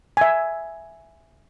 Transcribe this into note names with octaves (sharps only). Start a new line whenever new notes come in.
E5 G#5